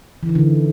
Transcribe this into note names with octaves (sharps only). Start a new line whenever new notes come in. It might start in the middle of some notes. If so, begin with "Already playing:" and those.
E3
D#3
D3